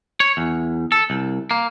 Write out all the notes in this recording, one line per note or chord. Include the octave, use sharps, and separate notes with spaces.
C#5
E2
A4
C2
A#3